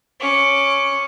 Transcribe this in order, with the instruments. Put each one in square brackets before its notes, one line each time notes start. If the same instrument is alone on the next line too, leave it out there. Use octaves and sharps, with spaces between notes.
[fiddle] C#4 D6